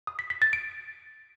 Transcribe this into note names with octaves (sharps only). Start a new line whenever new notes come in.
D#6
B6
B6
A6
D7